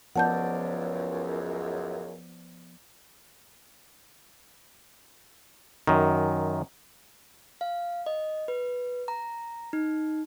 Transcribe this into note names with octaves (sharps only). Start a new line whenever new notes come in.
C#2 F#2 F3 B3 D5 F#5 A5 G6
F#2 D#3
F5
D#5
B4
A#5
D#4